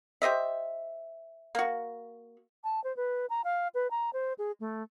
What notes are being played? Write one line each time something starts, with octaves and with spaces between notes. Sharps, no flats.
G4 C5 D#5 E5
A#3 F#4
A5
C5
B4
A#5
F5
B4
A#5
C5
G#4
A3